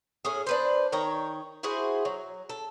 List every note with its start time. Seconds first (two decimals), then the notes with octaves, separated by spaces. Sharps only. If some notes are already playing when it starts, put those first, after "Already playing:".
0.25 A2 C#4 G#4
0.47 D4 B4 C5
0.92 D#3 C#5 G5 A#5
1.63 E4 F#4 G#4 C5
2.05 F#3
2.49 A4